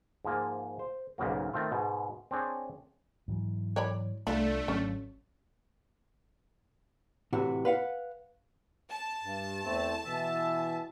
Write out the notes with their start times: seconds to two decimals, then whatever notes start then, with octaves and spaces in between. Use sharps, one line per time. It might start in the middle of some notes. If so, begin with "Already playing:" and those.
0.25 G#2 F3 A#3 G#5
0.79 C5
1.18 B1 G#2 C#3 F#3 A#3
1.53 D#3 A3 C4 F4
1.71 G#2 B2
2.31 C4 D4 G#4 C#5
3.28 G#2 E3 F#3
3.76 C#5 D5 B5
4.27 C2 A3 D4 F4 A4 B5
4.68 G#1 F#3 C#4
7.33 A2 C3 E3 F#4
7.65 B4 F5 F#5
8.91 A5
9.23 G2
9.64 E2 A3 C4
10.05 B2 E3 E5